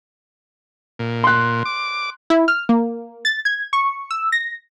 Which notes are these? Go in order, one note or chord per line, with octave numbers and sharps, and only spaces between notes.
A#2
C6 F#6
D6
E4
F6
A#3
A6
G#6
C#6
E6
A#6